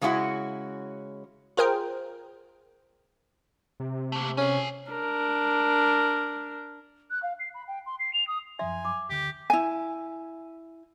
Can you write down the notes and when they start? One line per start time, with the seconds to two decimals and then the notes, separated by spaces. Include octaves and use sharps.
0.01 C#3 G#3 C#4 E4 F#4
1.57 F4 G#4 A#4 C5 G5 A#5
3.80 C3
4.12 A3 A#3
4.37 C#4 A4 G#5
4.91 D4 A#4
7.10 F#6
7.22 F5
7.39 C7
7.54 B5
7.67 G5
7.86 C6
7.99 C7
8.13 F7
8.27 D#6
8.59 F#2 F3 E5 G#5 C6
8.85 D6
9.10 D2 D3 G4 G6
9.50 E4 G#5